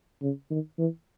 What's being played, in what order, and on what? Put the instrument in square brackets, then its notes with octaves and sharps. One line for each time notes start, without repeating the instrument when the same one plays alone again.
[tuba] C#3
D#3
E3